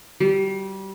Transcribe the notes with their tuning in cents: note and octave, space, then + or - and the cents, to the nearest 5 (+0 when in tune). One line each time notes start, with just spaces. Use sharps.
G3 -20